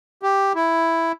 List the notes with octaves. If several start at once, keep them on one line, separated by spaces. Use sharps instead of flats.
G4
E4